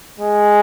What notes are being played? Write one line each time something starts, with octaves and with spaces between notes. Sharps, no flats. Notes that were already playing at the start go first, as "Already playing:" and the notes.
G#3